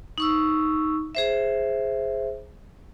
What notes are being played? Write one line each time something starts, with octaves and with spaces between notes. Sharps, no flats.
D#4 C#6 E6
G#4 C5 E5